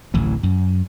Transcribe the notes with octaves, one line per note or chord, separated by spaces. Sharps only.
D1 A1 E3 F#3
F#2